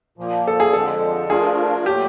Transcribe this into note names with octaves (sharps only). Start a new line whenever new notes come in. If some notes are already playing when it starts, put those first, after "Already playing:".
A#2 F3 A#3
A4
G#4
F2 D3 F3 G#3 A4
F3 A3 D4 F4 G#4 A#4
A#2 F#3 A3 G4